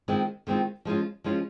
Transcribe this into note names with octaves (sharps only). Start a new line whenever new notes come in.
D#3 G#3 C4 F4
D#3 G#3 C4 F4
F3 G#3 C#4 F4
F3 G#3 C#4 F4